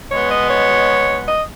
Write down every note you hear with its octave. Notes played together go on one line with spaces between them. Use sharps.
B2 G#3 B3 C#5
D#5
C#5
D#5